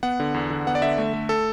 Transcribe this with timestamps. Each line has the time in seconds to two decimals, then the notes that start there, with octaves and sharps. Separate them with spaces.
0.03 B3 F#5
0.20 D3
0.34 E2
0.50 D3
0.67 B3 F#5
0.75 D5
0.82 D3 E5
0.98 A3
1.13 A3
1.29 A4